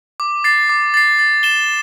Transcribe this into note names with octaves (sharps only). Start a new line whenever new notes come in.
D6
A6 C7
D6
A6 C7
A6
E7 G7